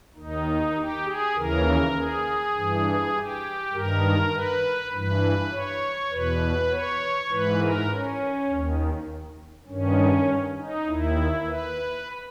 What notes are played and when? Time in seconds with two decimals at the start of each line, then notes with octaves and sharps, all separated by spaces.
0.16 D#2 D#3 D#4
0.75 G4
1.05 G#4
1.35 D#2 C#3 E3 A#4
1.94 G#4
2.54 G2 E3
3.13 G4
3.73 G2 D#3 A#4
4.32 B4
4.92 G2 E3 B4
5.51 C#5
6.10 E2 B2 B4
6.70 C#5
7.29 G#2 E3 B4
7.59 A#4
7.89 C#4
8.48 D#2 D#3
9.67 G2 D#3 C#4
10.57 D#4
10.86 D#2 D#3 E4
11.46 B4